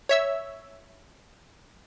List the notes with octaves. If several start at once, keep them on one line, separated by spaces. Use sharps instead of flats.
C#5 E5 E6